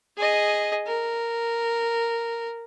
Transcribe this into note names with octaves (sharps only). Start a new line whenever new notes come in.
G#4 D#5
A#4